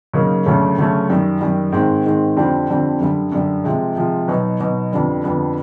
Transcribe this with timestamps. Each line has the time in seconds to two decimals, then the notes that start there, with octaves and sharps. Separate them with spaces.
0.14 C#3 F#3 A#3 D#4
0.46 D2 C#3 F#3 A3 C#4
0.78 D2 C#3 F#3 A3 C#4
1.10 F#2 D#3 G3
1.41 F#2 D#3 G3
1.72 G#2 D#3 G#3 C4
2.05 G#2 D#3 G#3 C4
2.37 F2 D3 G3 C4
2.69 F2 D3 G3 C4
3.00 F#2 D3 G3
3.32 F#2 D3 G3
3.64 C3 F3 G#3
3.96 C3 F3 G#3
4.28 B2 F#3 B3 D#4
4.60 B2 F#3 B3 D#4
4.92 F2 D3 G3 B3
5.24 F2 D3 G3 B3